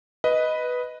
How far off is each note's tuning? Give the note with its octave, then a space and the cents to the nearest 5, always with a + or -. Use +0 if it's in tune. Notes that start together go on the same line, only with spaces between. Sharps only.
B4 +0 D#5 +5